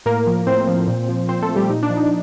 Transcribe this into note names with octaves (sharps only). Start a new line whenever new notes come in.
A2 A#3 A#4
F3
A2 C4 C5
F3
A#2
F3
A#2 C4 C5
A3 A4
F3
G3 G4
A#2 D#4
D4
F3
D#4